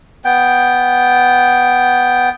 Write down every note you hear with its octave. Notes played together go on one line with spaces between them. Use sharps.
B3 G5